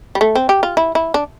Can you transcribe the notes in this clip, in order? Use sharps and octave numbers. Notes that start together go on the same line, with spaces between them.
G3
A3
C4
G4
F4
E4
E4
D4